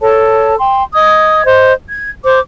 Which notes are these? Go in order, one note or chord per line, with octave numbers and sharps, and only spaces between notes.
A4 C#5 A5
G5 C6
D#5 D#6 G#6
C5 D#5
G#6
C5 D6